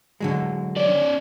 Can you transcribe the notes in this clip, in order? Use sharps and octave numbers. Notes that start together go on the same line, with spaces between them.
D3 F#3 G#3
C#4 D5